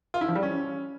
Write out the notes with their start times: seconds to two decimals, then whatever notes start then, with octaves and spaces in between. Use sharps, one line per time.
0.14 F4
0.21 E4
0.28 F3
0.35 G3
0.43 C#4